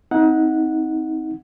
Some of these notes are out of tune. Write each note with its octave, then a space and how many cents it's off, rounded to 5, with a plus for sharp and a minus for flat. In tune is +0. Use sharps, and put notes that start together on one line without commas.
C4 +0 D#4 +30 F#5 -10